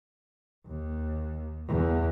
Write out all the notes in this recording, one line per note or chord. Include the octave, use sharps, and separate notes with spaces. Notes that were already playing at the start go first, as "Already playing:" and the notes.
D#2
E2